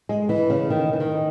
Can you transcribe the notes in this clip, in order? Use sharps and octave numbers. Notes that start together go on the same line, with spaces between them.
G#3
E3
C#3
D#3
E3
D#3